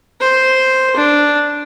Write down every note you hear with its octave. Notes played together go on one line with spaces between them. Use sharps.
C5
D4